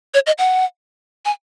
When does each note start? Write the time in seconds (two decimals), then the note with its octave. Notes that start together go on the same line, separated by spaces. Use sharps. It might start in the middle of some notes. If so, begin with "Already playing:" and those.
0.14 C#5
0.27 D#5
0.38 F#5
1.25 G#5